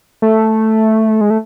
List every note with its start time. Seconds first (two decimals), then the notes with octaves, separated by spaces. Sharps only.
0.22 A3
1.21 G#3
1.30 A3